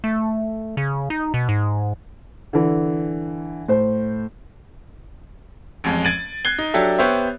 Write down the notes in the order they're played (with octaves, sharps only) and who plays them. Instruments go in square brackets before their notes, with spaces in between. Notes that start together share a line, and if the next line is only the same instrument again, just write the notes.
[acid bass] A3
C#3
D#4
B2
G#2
[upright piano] D3 E3
A2 C5
[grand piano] A1 F2 G#3
G#6 A6 D7 D#7 F#7
F#6 G#6 C7 G7
D#4
F#3 D4 G4 A4 E5
B3 G4 C5 C#5 E5